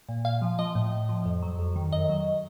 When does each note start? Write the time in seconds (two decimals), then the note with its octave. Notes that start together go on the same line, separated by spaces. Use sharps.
0.09 A#2
0.25 A#2 F5
0.42 F3
0.59 F3 D#5
0.75 A2
0.92 A2
1.09 F3
1.25 F2
1.42 F#3
1.59 F2
1.76 D#3
1.92 F#2 D#5
2.09 F#3